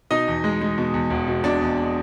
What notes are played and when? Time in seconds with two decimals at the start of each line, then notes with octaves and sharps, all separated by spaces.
0.11 B2 D#4 D#5
0.28 E2
0.44 G#3
0.61 G#3
0.78 B2
0.94 E2
1.10 E1
1.27 B2
1.44 B2 D4 D5
1.61 E2